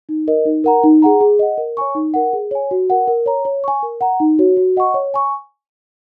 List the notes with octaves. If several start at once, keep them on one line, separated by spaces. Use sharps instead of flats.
D#4
A#4 D#5
D#4
A#4 F#5 A#5
D#4
G#4 F#5 A#5
G#4
D#5 F#5
A#4
C#5 G#5 C#6
D#4
A#4 F#5
G#4
C#5 G#5
F#4
A#4 F#5
A#4
C#5 A#5
C#5
G#5 C#6
A#4
F#5 A#5
D#4
F#4 C#5
F#4
D#5 F#5 C#6
C#5
G#5 C#6